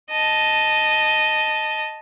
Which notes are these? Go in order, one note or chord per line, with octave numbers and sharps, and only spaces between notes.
D#5 A5